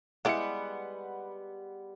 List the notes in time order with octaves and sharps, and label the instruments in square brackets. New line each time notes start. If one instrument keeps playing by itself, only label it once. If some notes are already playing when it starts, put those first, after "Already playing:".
[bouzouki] G3 B3 [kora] G#3 [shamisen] E4 D5 F5 [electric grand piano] F#5 C#7